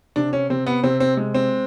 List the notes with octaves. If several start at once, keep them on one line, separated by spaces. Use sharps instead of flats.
C3 D4
C#4
C3 C4
B3
C3 C4
C4
G#3
C4